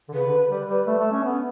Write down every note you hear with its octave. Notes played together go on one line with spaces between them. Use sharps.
D3
C#3 B4
D3
G3 B4
G3 B4
A3
A3
C#4
B3